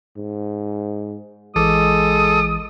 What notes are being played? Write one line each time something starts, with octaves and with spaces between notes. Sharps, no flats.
G#2
A1 E3 G#3 A4 D6 D#6